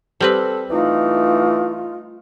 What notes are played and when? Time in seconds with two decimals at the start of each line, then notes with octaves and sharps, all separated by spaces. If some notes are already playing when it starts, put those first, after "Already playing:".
0.20 G3 C4 A4 B4
0.70 E3 A3 D#4 F4